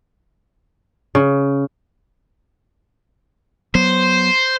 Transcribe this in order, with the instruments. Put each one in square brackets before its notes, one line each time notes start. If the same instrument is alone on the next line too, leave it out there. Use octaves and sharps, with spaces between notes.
[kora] C#3
[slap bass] F#3 B3 [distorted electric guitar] C5